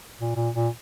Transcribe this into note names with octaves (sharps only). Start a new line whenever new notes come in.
A#2
A#2
A#2